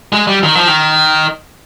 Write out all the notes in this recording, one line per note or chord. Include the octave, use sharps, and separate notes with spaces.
G#3
G3
D#3
F3
D#3